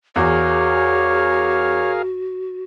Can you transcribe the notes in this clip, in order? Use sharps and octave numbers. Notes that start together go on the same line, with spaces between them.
E2 F#4 G#4 A#4 C#5 F5